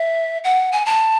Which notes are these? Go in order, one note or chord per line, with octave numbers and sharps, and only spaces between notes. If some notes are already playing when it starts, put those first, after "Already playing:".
Already playing: E5
F#5
G#5
A5